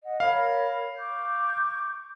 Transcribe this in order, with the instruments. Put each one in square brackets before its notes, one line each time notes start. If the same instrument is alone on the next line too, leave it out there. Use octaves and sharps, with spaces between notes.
[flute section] D#5 F#5
[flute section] A#4 C#5 B5 [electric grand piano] F5
[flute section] C#6 D6 G6